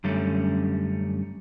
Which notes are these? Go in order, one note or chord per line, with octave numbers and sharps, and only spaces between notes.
F#2 D3 G3 A3 C#4